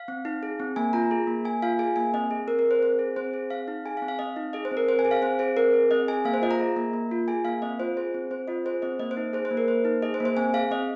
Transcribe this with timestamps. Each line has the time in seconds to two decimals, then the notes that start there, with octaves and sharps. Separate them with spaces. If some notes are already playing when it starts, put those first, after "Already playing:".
Already playing: F5
0.08 C4
0.25 D#4
0.43 G#4
0.60 C4
0.76 A#3 G#5
0.93 F4 A#5
1.11 G#4
1.27 A#3
1.45 A#3 G#5
1.63 F4 F5
1.79 G#4 G#5
1.96 A#3 G#5
2.14 C4 D#5
2.31 G#4
2.47 C4 A#4
2.59 A#4
2.65 G#4
2.71 C5
2.82 C4 C5
2.99 G#4
3.16 C4 C5
3.34 G#4
3.50 C4 F5
3.68 D#4
3.86 G#4 G#5
3.97 F5
4.02 C4
4.08 F5
4.19 C4 D#5
4.36 D#4
4.53 G#4 D#5
4.65 C5
4.71 C4
4.77 A#4
4.88 C4 C5
4.99 G#5
5.05 G#4
5.11 F5
5.22 C4 C5
5.39 G#4 C5
5.57 C4 A#4
5.73 G#4
5.91 C4 D#5
6.08 G#4 G#5
6.25 A#3 F5
6.34 C5
6.42 F4 D#5
6.51 A#5
6.60 G#4
6.77 A#3
6.93 A#3
7.11 F4
7.28 G#4 G#5
7.45 A#3 F5
7.62 C4 D#5
7.80 F4 C5
7.97 G#4 C5
8.14 C4
8.31 C4 C5
8.48 F4 D#5
8.65 G#4 C5
8.82 C4 D#5
8.99 A#3 D#5
9.11 C5
9.17 D#4
9.33 G#4 C5
9.45 C5
9.51 A#3
9.57 A#4
9.68 A#3 C5
9.85 D#4
10.02 G#4 D#5
10.14 C5
10.20 A#3
10.25 C5
10.37 C4 G#5
10.54 G#4 F5
10.71 C4 D#5